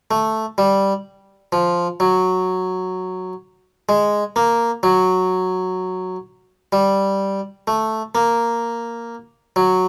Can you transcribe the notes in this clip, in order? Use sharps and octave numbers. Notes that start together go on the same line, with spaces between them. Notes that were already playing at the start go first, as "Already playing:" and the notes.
A3
G3
F3
F#3
G#3
A#3
F#3
G3
A3
A#3
F#3